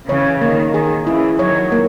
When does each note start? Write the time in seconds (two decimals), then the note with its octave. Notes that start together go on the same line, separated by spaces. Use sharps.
0.08 C#3 E3 C#5
0.41 D#3 A#3
0.74 D#3 G#4
1.07 C#3 E3 E4
1.39 D#3 F#3 C#5
1.72 A#3